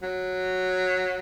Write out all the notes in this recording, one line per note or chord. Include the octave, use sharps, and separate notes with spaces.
F#3